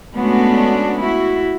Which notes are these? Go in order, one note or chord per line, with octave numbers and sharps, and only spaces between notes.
G#3 A3 B3 C#4 D4 F#4
E4 F#4